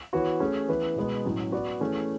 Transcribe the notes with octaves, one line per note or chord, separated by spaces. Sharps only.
E3 B3 F#4 C#5
A3 C#4 G#4
E3 B3 E4 B4
B2 G#3 B3
A2 F#3 C#4
B3 F#4 B4 D5
E3 A3 C#4 G#4 B4